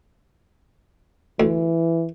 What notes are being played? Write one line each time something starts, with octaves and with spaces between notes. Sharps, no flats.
D2 E3